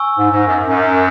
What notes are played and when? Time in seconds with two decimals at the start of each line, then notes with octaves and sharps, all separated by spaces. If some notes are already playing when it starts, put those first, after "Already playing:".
Already playing: G#5 C#6 E6
0.17 G#2
0.31 G#2
0.45 F#2
0.64 F#2